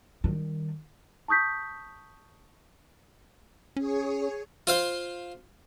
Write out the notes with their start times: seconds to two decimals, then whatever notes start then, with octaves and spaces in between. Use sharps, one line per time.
0.24 D#3 G3
1.28 A5 C#6 D#6 G6 B6
3.77 C#4 G#4 C#5
4.67 F4 C5 F5